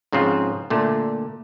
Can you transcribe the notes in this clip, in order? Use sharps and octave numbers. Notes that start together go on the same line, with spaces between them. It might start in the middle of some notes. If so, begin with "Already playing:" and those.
G#2 C#3 F3 C4 F4
A#2 D3 A3